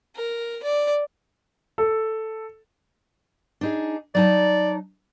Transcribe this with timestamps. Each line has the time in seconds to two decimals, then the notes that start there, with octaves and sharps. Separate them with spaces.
0.16 A#4
0.63 D5
1.78 A4
3.61 D4 D#4 G#4
4.15 F#3 D#4 D5 A5